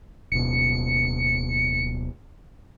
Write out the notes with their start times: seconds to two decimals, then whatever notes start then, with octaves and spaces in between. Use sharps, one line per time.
0.32 D1 B2 C#7